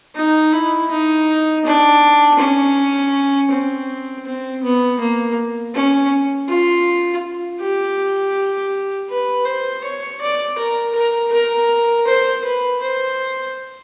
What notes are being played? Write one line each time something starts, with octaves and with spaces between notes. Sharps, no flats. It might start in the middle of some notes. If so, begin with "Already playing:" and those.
D#4
E4
D#4
D4
C#4
C4
C4
B3
A#3
C#4
F4
G4
B4
C5
C#5
D5
A#4
A#4
A#4
C5
B4
C5